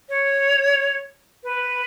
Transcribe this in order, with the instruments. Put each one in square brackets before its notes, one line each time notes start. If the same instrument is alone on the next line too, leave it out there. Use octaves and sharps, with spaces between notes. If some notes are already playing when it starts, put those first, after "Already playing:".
[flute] C#5
B4